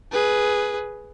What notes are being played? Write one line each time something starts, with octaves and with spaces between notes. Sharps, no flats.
G#4 B4